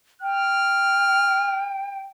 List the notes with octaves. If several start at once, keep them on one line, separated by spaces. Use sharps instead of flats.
G5 F6